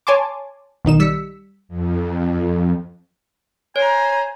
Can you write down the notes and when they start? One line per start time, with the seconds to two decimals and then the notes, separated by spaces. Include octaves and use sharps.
0.07 C#5 G#5 A5 C6 D6
0.85 B1 D#3 D#4 E7
1.00 G3 E6 B6 C#7
1.68 F2
3.76 C5 C#5 G#5 A#5